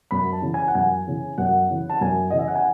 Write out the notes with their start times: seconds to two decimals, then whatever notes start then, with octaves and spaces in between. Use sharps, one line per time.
0.11 F#2 B5
0.33 A5
0.42 C#3 E3
0.54 G#5
0.68 F#5
0.75 F#2 G#5
1.07 C#3 E3
1.38 F#2 F#5
1.70 C#3 E3
1.90 A5
2.01 F#2 G#5
2.30 C#3 E3 D#5
2.39 E5
2.48 F#5
2.55 G#5